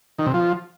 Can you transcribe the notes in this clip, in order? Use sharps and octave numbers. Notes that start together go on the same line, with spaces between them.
D#3
C3
F3